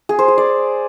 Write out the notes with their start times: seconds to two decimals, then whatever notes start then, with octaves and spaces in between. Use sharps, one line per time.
0.09 G#4
0.19 C5
0.28 G#4
0.38 D5